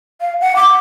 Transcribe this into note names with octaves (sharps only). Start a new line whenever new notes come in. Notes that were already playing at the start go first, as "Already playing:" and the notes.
F5
F#5
D6